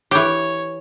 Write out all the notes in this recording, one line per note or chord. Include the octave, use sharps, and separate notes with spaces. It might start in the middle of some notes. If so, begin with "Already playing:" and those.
E3 G4 C#5